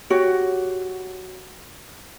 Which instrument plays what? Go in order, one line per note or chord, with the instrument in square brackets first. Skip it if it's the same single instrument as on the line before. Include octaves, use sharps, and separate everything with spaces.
[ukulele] F#4 G4 C#5